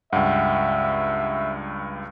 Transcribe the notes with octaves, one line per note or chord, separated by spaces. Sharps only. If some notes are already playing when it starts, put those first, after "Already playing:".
C#2 G2 E5 F#5 G5